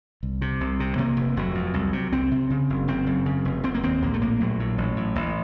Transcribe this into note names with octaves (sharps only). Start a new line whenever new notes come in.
C2
C3
C2
C3
C3 A#3
F1
F1 F#3
F2
C2
C3
C2 C4
C3
C#3
F#1
F#1 C4
F#2
C#3
F1
F1 C4
A#3
D#2 C4
A#1 A#3
A3
A2 A#3
A#1 F#3
A2
A1
A2
A1